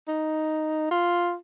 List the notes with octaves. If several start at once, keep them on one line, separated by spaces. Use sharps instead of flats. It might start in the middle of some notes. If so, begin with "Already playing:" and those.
D#4
F4